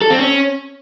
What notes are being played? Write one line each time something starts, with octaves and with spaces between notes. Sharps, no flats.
A4
C4
C#4